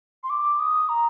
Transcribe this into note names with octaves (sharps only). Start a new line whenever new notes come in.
C6
D6
D#6
A#5